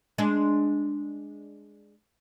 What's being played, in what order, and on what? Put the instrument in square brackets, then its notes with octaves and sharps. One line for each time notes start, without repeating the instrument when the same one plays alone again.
[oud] G#3 D4